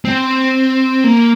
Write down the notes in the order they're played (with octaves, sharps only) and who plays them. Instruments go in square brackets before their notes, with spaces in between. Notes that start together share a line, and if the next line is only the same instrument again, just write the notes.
[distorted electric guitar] C4
A#3